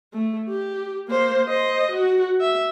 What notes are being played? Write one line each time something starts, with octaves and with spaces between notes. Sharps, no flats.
A3
G4
A#3 C5
C5 D#5
F#4
E5